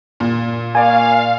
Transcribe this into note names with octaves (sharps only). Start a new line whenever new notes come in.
A#2
A#3 D5 F5 G#5 C#6